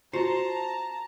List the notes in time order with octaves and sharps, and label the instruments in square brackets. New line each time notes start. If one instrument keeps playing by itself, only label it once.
[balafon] F4 F#4 [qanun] C5 [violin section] A5 A#5